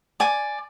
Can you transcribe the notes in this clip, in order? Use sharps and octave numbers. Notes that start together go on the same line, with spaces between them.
D5 G#5 D6